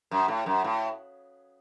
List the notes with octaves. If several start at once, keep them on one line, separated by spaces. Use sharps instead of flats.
F#2
A2
F#2
A2